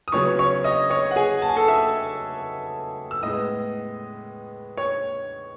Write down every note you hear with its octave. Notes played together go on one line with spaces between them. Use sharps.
D#6
C#3 F#3 B3 C#5 C#6
C#5 C#6
D#5 D#6
C#5 C#6
F#5
G#4 G#5
A5
G#5
A4 A5
E5 E6
E6
A2 G#3 B3 D#5 D#6
C#5 C#6